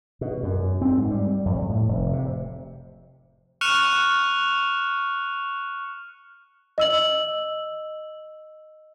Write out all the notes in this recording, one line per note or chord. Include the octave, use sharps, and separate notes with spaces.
B2
F#2
C4
G#2
G3
F2
A2
F1
C3
C#6 F6 F#6 C#7 E7 F7
D#5 E6 F#7